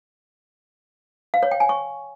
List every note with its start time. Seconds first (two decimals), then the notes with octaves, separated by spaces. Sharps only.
1.34 F5
1.43 C#5
1.51 G5
1.60 G#5
1.69 C#6